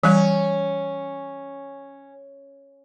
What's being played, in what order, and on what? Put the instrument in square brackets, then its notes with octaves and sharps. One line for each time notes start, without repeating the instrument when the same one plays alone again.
[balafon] E3 G3 [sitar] C#4